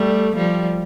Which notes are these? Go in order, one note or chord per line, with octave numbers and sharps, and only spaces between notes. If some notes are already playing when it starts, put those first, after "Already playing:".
Already playing: G3 A3
F3 G3